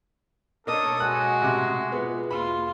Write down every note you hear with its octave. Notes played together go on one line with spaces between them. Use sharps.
B2 A#3 D4 A4 C#5 D#5 D#6 E6
G#3 F#4 F#6
A1 C3 D6
B3 F4 G#4
E2 A#3 F4 B5